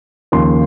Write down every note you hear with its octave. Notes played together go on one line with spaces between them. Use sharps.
D#2 C#3 F3 C6